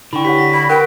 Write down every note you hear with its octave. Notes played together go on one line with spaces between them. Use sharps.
D3 E4 G5 B5 C#6
G4 C#5 F#5 B6
A#6 B6
D5 B5
A#4 F#5 G5 C6 F#6